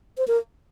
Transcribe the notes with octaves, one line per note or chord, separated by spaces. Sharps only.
C5
A#4